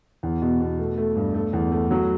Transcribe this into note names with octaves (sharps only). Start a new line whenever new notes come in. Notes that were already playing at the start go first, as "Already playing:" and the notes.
E2
B2
B2
A3
A3
G2
A3
E2
A3
F#3